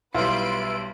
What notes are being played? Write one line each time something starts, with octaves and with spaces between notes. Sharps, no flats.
B1 G3 E4 F4 B4 C6 D7